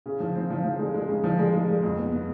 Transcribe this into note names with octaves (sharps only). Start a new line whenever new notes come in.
C#3
F3
C4
F3
F3
G#3
G#3
C#3
F3
G#3
G#3
G#3
F2
B3
B3